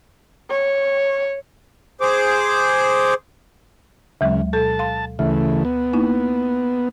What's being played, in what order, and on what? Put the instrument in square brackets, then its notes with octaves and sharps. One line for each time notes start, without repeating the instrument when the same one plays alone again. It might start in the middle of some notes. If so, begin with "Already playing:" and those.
[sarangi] C#5
[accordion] G#4 C5 D6
[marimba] D2 F#3 G#3 [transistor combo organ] C#3
[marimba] B2 A4 [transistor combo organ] A5
[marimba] F5 C6
[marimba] D2 [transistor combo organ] C#3 E3 A3
[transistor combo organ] B3
[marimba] A#3 D#4 E4